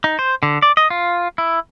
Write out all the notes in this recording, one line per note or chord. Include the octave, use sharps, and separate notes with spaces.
D#4
C5
D3
D5
D#5
F4
E4